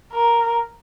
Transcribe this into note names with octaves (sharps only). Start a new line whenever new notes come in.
A#4